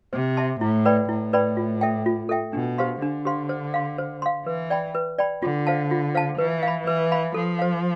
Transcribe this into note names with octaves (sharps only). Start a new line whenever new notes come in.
C3 C5
E5 A5 C6
A2 E4
B4 D5 G5 B5
A2 E4
B4 D5 G5 B5
F4
A4 E5 G5
F4
A4 E5 G5
B2 D4
G4 C5 F5 C6
D3 D4
G4 C5 F5 C6
C5
F5 C6
C5
F5 C6
E3 B4
D5 G5 B5
B4
D5 G5 B5
D3 F4
C5 F5 A5
F4
C5 F5 A5
E3 B4
F5
B5
E3 B4
F5 B5
F3 A4
C5 F5